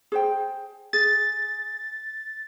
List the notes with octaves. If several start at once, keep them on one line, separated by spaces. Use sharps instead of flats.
G#4 C5 G5
G#4 A6